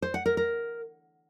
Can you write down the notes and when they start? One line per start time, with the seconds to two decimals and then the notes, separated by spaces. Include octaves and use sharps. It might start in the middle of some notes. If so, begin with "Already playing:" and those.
0.02 C5
0.14 F#5
0.26 A#4
0.37 A#4